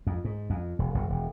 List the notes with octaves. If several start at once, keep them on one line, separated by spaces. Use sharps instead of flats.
F2
G#2
F2
E1
F#1
E1